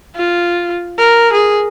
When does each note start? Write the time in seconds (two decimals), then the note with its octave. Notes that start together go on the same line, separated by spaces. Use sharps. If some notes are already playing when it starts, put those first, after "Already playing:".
0.16 F4
0.99 A#4
1.33 G#4